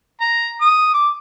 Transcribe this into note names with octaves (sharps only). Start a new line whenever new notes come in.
A#5
D#6
D6